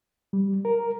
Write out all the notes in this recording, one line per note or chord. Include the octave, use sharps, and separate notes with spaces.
G3
A#4